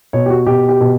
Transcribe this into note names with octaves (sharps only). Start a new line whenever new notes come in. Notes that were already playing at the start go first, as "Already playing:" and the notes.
B2 C#5
G4
F#4
B2 G4
G4
B2